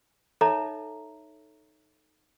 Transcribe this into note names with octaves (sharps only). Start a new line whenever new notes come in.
D#4 A4 C#5 E5 A#5